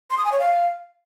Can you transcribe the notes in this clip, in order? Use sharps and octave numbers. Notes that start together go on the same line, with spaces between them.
C6
D#6
G#5
C#5
F5